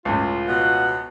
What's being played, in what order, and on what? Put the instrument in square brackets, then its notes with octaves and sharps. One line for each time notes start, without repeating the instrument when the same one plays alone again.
[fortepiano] C#2 A2 [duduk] F4
[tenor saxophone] B2 [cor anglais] F#5